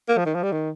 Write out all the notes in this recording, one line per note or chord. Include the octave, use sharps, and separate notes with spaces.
A#3
F3
D#3
F3
G3
D#3